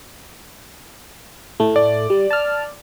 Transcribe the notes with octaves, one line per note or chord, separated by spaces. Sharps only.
A2 A3
D5
G3
A5 F6